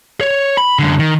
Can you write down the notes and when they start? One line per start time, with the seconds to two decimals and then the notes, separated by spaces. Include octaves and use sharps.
0.21 C#5
0.58 B5
0.79 F#2 D3
0.99 D#3